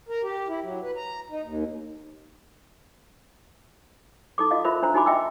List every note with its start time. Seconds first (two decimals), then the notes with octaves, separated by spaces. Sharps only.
0.09 A#4
0.23 G4
0.48 E4
0.63 F#3
0.83 B4
0.96 A#5
1.30 D#4
1.42 D#2
4.38 D#4 A4 D6
4.51 F4 D#5 F5
4.65 F4 A#4 C5 E5 B5
4.82 D4 C5 A#5
4.94 D#4 F#4 G#5 B5 D6
5.06 D#5 E5 G5 E6